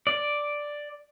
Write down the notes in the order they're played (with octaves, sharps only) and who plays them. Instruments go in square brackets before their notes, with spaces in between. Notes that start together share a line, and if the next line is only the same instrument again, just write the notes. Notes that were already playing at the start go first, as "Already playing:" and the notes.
[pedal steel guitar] D5